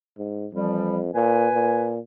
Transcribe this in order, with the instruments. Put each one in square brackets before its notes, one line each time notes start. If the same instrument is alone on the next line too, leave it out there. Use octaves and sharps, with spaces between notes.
[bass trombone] G#2
[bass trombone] F2 [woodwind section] E3 F3 G3
[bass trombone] A#2 [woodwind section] B4 G#5
[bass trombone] A#2